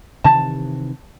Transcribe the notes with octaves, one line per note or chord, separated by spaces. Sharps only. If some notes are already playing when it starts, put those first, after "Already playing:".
C3 D#3 E3 A5